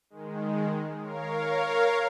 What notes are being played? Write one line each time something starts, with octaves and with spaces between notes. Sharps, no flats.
D#3 G#3
A#4 C#5 F5